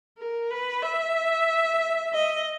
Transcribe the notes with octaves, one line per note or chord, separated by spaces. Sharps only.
A#4
B4
E5
D#5